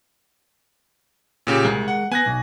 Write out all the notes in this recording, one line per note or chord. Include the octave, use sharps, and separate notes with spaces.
A#2 C#3 G4
C2 G#3 A#4
F#5
B3 G#5 F#6 A#6
B1